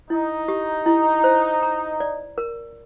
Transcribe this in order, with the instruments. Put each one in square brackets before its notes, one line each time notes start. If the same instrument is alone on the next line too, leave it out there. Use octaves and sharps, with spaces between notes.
[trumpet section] D#4 [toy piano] E4
[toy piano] G4
E4
C5
A#5
D5
A#4